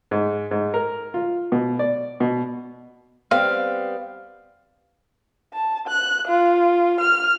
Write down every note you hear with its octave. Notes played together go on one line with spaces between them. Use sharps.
G#2
G#2
A#4
F4
B2
D5
B2
G3 B3 C4 F5
A5
F#6
F4
F6